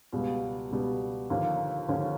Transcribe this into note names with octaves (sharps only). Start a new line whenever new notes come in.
C#2 B2 G3
C#2 B2 G3
D#2 D3 F3 A#3 C#4
D#2 D3 F3 A#3 C#4